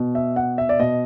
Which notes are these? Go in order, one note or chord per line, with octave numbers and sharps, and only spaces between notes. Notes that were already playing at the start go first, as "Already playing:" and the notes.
Already playing: B2
E5
F#5
E5
D5
B2 D#5